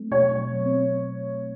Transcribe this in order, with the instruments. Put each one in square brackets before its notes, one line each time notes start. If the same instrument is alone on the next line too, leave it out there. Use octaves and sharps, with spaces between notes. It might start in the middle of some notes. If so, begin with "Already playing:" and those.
Already playing: [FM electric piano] F#3 A3 C4
[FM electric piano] B2 [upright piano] C#5
[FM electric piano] F#3
C4